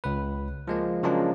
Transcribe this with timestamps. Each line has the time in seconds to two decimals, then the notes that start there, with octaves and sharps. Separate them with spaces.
0.04 C#2 B4
0.68 F3 G#3 A#3
1.03 C#3 F3 F#3 G#3 A#3 D4